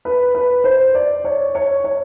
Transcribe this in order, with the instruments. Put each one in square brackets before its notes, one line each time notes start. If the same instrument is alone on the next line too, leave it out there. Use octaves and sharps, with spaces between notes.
[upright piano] B4
B4
C5
D5
C#5
C#5
C#5